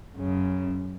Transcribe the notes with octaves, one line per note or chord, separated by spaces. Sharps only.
F#2 C#3